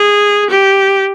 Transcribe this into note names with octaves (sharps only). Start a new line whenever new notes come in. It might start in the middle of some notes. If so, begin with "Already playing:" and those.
Already playing: G#4
G4